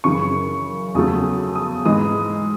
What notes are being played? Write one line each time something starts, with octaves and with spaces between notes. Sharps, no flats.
F#2 C#3 E3 C#6
E2 C#3 F#3 A3 D#6
D#6
G#2 E3 G#3 D#6